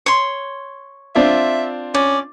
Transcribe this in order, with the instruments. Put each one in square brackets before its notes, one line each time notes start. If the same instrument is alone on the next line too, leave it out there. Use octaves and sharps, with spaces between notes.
[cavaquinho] C#5 C6
[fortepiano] C4 D4 F4 [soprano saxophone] E5
[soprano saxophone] C#4 [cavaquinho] D5